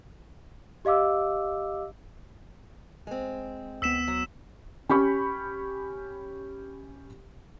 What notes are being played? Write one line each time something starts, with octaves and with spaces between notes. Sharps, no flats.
G4 D#5 F5 D6 E6
G#3 C4
D2 B3 E6 B6 E7
F#3
C#4 G4 B5 C#6